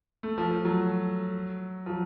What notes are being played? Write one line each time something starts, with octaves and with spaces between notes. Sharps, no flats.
A3
F3
F3
F#3
F3
F#3